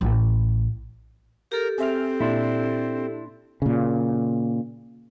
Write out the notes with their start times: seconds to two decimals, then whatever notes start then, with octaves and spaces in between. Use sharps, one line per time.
0.01 A1
1.52 G4 A4 A#4
1.78 C4 G#4 E5 F6
2.21 A#2 D4 E4 C6
3.62 A#2 C#3